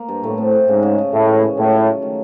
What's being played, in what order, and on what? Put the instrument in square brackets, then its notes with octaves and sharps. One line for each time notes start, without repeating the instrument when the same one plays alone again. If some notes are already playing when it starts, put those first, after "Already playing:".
Already playing: [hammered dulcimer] A#3
G2
[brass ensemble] A2 [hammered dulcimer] A3
[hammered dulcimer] C4
A3
[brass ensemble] G#2 [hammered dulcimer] C#3
[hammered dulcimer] C#3
C#3
[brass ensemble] A2 [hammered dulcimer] G#3
[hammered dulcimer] E3
C#4
[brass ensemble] A2 [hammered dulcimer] F#3
[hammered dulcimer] F4
A3
D#3